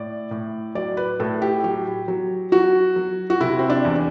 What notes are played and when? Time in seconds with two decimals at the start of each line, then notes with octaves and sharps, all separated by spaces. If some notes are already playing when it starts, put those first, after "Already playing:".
Already playing: A2 D5
0.31 A2
0.75 F#3 D5
0.97 B4
1.20 A2 A4
1.42 G4
1.64 F#3 G4
2.08 F#3
2.52 F#3 F#4
2.96 F#3
3.30 F#4
3.41 C3 E4
3.59 C4
3.70 D4
3.85 E2